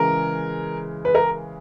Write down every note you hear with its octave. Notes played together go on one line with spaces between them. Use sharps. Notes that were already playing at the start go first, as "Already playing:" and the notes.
Already playing: C#3 E3 G#3 A#4
B4
A#4